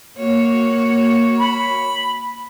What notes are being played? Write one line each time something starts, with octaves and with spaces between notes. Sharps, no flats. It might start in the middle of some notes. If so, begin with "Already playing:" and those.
A#3 F#4 C#5
B5